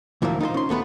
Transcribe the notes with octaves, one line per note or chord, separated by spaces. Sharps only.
D2 A#2 E3 F3 G3 A#3
D#4 F4 A4 C5
C#4 C6
D#2 A3 B3 B4